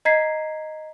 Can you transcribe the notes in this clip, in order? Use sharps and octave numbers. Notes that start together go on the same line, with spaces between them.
D#5 A#5 G#6 B6 C7